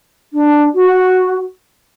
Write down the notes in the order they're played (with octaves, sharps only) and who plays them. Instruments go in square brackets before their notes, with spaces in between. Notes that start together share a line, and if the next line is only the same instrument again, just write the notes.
[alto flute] D4
F#4